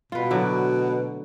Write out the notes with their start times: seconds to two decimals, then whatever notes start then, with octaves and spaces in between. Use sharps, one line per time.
0.12 B2 F4 B4
0.30 A2 D3 F#3